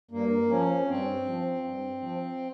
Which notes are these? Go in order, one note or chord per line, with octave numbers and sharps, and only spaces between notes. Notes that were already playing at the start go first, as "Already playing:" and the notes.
G2 A#3
F3 C#4
G2 C4
F3
G2
F3